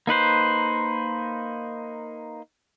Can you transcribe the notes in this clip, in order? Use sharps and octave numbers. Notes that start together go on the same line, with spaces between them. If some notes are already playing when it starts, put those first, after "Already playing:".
A#3 D#4 B4 C5